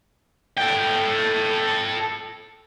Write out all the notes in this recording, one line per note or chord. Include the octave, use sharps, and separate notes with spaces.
A4 G5